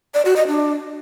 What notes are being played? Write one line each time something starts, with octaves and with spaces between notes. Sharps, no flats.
D5
F#4
D#5
D4